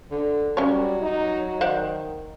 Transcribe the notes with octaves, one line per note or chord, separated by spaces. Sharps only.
D3
F#3 G3 C#4 C#5
D#4
D#3 C5 D5 F#5